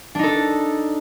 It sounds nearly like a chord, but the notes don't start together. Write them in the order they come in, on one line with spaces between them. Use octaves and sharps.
D4 D#4 A4